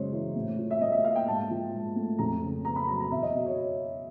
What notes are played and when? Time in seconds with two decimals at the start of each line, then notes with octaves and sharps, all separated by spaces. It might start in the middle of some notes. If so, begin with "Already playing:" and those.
Already playing: F#2 C#3 G#3 C5 C#5
0.12 E3
0.36 A2
0.58 F3
0.71 E5
0.81 A2 D#5
0.92 E5
1.04 A#3 F5
1.15 G5
1.28 G#2 A5
1.50 F3
1.73 G#2
1.96 A3
2.18 F2 A#5
2.43 C#3
2.65 B3 A#5
2.76 B5
2.88 F#3 A#5
3.00 A#5
3.12 E2 E5
3.23 D#5
3.34 B2
3.46 C#5